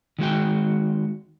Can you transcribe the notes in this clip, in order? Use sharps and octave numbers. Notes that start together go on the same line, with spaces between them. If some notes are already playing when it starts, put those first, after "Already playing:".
D#3 G#3 F#4 G5